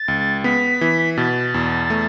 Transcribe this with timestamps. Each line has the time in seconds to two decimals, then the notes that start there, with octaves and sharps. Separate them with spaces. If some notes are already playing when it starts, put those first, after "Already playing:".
Already playing: A6
0.08 C#2
0.44 B3 B6
0.81 E3
1.17 B2 A6
1.54 E2
1.90 A3